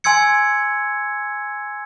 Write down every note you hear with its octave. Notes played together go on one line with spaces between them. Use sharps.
G#5 C6 E6 G#6 C#7